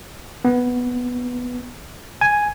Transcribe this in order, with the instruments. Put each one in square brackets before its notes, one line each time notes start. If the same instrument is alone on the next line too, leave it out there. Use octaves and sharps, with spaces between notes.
[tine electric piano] B3
G#5